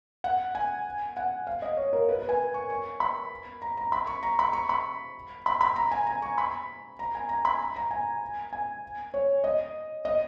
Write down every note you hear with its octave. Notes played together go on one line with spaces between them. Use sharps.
F#5
G#5
F#5
F5
D#5
C#5
A#4
B4
B4
G#5
C#6
C#6
B5
A#5
A#5
B5
C#6
A#5
B5
C#6
B5
B5
B5
A#5
G#5
A#5
C#6
B5
A#5
G#5
A#5
B5
A#5
G#5
G#5
C#5
D#5
D#5